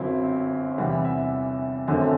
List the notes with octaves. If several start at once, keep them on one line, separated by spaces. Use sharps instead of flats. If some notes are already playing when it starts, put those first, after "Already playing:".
Already playing: G1 F#2 F#3 C4 E4
E2 C3 E3 G3 F#5
E5
G1 F#2 D3 A3 C4 F#5